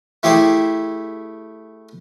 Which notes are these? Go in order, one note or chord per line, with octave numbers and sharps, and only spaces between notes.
A3 E4 G4 G#4 C5